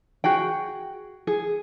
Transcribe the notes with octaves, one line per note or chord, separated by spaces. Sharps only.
F#4 G#4 G5
G#4